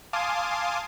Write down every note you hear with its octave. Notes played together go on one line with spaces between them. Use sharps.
F5 G#5 A5 C6 D6 D#6